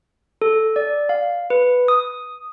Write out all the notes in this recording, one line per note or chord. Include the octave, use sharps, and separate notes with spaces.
A4
D5
F5
B4
D#6